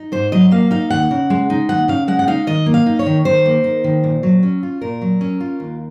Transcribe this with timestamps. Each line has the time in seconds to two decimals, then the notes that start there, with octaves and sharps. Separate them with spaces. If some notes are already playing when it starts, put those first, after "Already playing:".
Already playing: D#4
0.12 G#2 C5
0.32 F#3 D#5
0.51 A#3 F5
0.71 D#4 F5
0.90 D#2 F#5
1.11 C#3
1.30 G#3
1.50 D#4
1.69 D#2 F#5
1.88 C#3 F5
2.08 G#3 F#5
2.19 F#5
2.27 D#4 F5
2.47 D#3 D#5
2.66 A#3
2.74 F5
2.86 D#4
2.99 C#5
3.06 D#3
3.25 D#3 C5
3.45 A#3
3.64 D#4
3.84 D#3
4.03 A#2
4.23 F#3
4.43 C#4
4.63 F4
4.81 A#2 A#4
5.01 F#3
5.21 C#4
5.40 F4
5.60 D#2